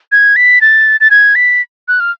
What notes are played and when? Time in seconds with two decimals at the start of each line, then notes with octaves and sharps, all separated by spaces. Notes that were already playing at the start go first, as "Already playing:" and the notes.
0.12 G#6
0.36 B6
0.61 A6
1.00 A6
1.10 G#6
1.35 B6
1.88 F#6
2.00 F6